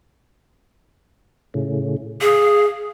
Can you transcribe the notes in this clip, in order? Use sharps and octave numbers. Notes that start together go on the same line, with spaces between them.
A2 C#3
G#4 F5